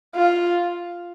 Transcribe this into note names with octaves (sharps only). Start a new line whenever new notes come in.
F4